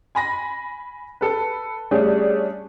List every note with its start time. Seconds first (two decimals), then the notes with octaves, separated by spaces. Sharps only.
0.15 G#5 B5 A#6
1.21 A4 B4
1.91 G3 A3 C#4 D4 G#4